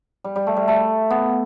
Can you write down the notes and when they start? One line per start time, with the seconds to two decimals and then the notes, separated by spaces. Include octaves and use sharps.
0.24 G3
0.36 G3
0.47 A3
0.57 G3
0.68 A3
1.10 B3